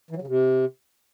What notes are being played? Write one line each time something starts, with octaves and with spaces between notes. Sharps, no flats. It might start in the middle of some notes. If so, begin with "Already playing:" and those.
E3
F#3
C#3
C3